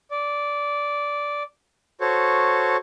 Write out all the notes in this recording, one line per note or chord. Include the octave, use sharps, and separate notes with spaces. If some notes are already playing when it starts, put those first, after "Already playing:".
D5
F#4 A4 C5 C#5